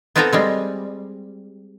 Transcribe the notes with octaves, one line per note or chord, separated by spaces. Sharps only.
B3 C4 F4 A4 G#5 A#5
G3 G#3 C4